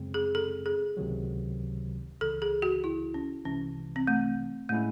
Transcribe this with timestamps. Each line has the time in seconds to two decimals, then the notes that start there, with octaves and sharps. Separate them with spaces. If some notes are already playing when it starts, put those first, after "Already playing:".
Already playing: F#2 C#3 G#3 C4
0.14 G#4
0.35 A4
0.66 G#4
0.97 C#2 C3 D#3 F#3
2.21 C#2 C#3 E3 A4
2.42 G#4
2.62 F#4
2.84 E4
3.14 C#4
3.45 C2 C3 E3 G#3 C#4
3.96 C4
4.07 A3
4.69 A2 G#3 A3 C#4 E4